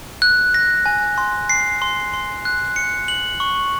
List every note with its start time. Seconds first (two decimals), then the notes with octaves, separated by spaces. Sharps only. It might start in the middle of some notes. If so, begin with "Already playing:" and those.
0.22 F#6
0.54 A#6
0.86 G#5
1.18 C6
1.50 C7
1.82 C6
2.14 C6
2.45 F#6
2.76 C#7
3.08 F#7
3.40 C#6